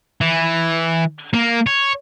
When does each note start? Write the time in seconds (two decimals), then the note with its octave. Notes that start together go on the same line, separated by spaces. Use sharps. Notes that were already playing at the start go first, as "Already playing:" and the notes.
0.21 E3
1.34 A#3
1.67 C#5